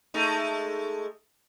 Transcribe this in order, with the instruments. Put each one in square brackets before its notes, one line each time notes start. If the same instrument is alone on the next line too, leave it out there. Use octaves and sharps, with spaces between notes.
[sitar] G#3 A3 D#4